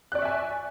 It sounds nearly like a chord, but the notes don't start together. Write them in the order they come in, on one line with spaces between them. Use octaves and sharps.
F#6 D5 C#6 E5 G#5